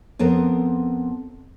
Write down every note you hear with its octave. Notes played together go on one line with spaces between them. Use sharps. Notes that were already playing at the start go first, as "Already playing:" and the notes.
F2 B3 C4 A#4